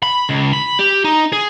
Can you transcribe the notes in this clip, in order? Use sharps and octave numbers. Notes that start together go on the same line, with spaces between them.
B5
C#2
B5
G4
D#4
G#4